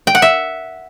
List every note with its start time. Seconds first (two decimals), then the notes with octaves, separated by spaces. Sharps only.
0.07 G5
0.15 F#5
0.22 E5